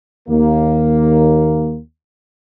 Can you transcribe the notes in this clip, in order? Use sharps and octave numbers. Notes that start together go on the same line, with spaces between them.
D#2 A#3